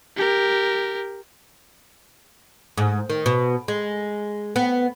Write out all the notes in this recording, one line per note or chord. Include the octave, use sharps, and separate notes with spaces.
G4 A#4
G#2
D#3
B2
G#3
B3